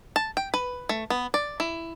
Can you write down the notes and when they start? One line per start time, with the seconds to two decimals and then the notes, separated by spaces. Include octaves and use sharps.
0.16 A5
0.37 G5
0.54 B4
0.89 A3
1.10 B3
1.34 D5
1.60 E4